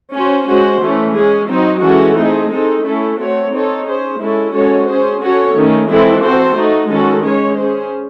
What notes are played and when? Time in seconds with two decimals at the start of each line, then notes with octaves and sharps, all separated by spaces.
0.13 C#4 F#4 C5
0.47 G#3 C#4 F#4 C5
0.81 E3 A3 C#4
1.15 G#3 C#4 G#4
1.49 F#3 C4 D#4
1.83 E3 G#3 C#4 F#4 A4
2.17 A3 C4 D#4 G#4
2.51 G#3 C4 D#4 A4
2.84 A3 C#4 E4 A4
3.18 A3 C4 F#4 C#5
3.52 C4 D#4 A4 C#5
3.85 C#4 G#4 C5
4.20 G#3 C#4 E4 A4
4.53 G#3 C#4 F#4 A4 C#5
4.87 C#4 G#4 C5
5.21 C#4 F#4 A4 C#5
5.55 D#3 A3 C#4
5.89 E3 G#3 C4 E4 A4
6.22 C4 F#4 A4 C5
6.57 A3 D#4 F#4
6.90 D#3 G#3 C#4 F#4 A4
7.24 G#3 C#4 G#4 C#5
7.58 C#4 G#4 C5